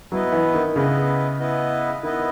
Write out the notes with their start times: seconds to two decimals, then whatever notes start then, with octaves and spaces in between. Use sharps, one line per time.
0.12 F#3 B3 E4 B4 D#5
0.32 E3
0.54 D#3
0.75 C#3 B3 E4 B4 D#5
1.39 B3 E4 B4 D#5
2.03 D#3 B3 E4 B4 D#5